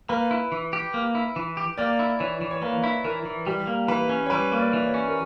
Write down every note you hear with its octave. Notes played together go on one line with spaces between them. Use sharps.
A#3 B4
E4
E3
G4
A#3
E4
E3
G4
A#3 D5
E4
E3 C#5
E3
C#5
A#3 B4
E4
E3 A#4
E3
G3 G4
A#3
E3 B4
C#4
C#5
G3 B4
A#3
D5
E3
C#5
C#4
A#4